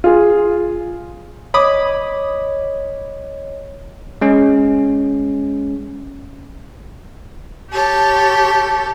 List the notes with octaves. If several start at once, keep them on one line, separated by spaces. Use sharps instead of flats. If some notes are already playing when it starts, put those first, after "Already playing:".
F4 G#4
C#5 D#5 B5 D6 D#6
G#3 C#4
G4 A4 C#5